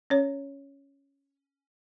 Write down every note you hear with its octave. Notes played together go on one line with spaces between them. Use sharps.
C#4 C#5